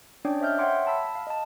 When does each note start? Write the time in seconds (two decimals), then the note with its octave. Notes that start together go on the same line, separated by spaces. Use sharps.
0.25 C#4 D4 C#5 D5 G5 D6
0.41 C5 D#5 E5 F6 G6
0.58 C#5 E5 F#5 G5 C6 D6
0.87 A5 B5 E6 B6
1.15 F5
1.27 D#5 A5